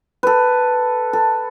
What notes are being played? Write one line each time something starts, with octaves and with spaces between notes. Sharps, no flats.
A4 B4
A4